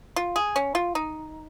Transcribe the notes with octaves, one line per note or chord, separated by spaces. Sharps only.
F4
G#4
C#4
F4
D#4